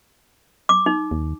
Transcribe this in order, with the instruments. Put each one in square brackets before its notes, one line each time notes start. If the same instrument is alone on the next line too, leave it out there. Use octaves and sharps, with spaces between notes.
[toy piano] D6
D#4
[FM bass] D#2